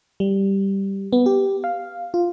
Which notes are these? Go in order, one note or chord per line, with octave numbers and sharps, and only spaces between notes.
G3
B3
G4
F5
F4